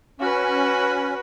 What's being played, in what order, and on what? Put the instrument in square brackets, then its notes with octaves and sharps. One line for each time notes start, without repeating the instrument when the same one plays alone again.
[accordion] C#4 [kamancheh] F#4 B4